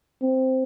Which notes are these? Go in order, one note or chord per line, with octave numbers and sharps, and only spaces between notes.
C4